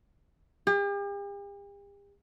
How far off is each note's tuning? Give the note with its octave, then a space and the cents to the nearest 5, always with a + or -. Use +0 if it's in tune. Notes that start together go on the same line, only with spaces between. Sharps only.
G4 +45